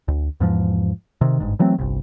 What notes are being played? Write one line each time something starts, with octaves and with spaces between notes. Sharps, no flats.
D2
E2 G#2 F3
C3 D#3
G1 G#2
E3 F#3 A3 C4
G1 C2